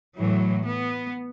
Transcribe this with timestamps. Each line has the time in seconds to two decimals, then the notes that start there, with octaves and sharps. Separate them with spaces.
0.17 A2 E3 F#3
0.66 B3